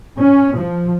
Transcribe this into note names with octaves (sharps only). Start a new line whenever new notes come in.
C#4
F3